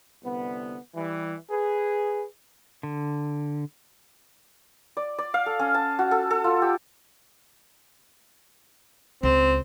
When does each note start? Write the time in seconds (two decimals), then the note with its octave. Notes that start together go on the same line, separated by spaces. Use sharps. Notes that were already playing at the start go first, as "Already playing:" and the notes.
0.23 C2 D3 B3
0.95 E3 G3
1.50 G#4 B4
2.83 D3
4.97 D5
5.18 D5
5.34 F5
5.46 A4
5.59 C#4
5.74 A5
5.99 F#4
6.11 A4
6.31 A4
6.44 F4
6.62 G4
9.23 C#2 C4